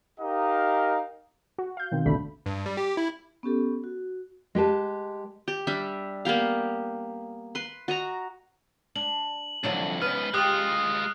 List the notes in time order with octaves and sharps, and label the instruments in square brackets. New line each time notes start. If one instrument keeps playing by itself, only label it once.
[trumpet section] D#4 G4 A#4 D#5 F5
[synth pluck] F#4
F5 G6
B2 D#3 C4
A1 D2 B2 D3 A3 B5
[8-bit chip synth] G2
G3
G4
E4
[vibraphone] B3 C#4 G4 A4
F#4
[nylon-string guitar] G#3 G4 B4 A5
[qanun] G4
G3 D4 E5
A#3 B3 G4 F5
B4 C6
F#4 D#5 A#5
[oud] D4 [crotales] F#7
[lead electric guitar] C2 F2 [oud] D3 F#3 D4
[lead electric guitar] G#2 B4 [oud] B3 C#4 [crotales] F6
[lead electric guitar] G#3 F4 [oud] G4 [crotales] D#6 F#6